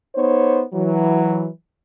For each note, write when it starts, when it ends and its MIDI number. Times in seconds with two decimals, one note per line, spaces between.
0.16 0.63 59
0.16 0.63 63
0.16 0.63 72
0.16 0.63 73
0.74 1.48 52
0.74 1.48 54